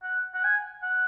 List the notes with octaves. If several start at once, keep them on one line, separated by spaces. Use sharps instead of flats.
F#5
F#5
G#5
F#5